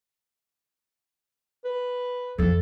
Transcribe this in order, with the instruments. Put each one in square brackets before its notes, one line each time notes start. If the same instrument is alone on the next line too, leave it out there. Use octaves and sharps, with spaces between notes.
[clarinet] B4
[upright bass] F2 F3 [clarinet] A4